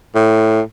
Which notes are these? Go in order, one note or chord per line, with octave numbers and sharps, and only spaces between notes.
A2